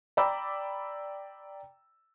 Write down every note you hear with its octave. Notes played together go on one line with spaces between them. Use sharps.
D5 G5 A#5 B5 D6 E6